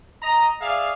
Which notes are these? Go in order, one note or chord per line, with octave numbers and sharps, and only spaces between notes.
D#5 A#5
G#4 D5 E5 F5